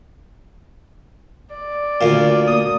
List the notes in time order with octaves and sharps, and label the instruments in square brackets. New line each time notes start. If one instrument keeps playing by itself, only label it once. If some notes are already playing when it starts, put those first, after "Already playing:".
[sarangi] D5
[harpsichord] D2 A#2 [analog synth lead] F5
[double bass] A#3 [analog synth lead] D#6